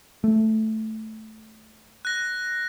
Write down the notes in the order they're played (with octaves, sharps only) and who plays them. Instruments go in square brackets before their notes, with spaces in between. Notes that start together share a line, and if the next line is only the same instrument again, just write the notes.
[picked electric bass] A3
[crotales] F#6 A#6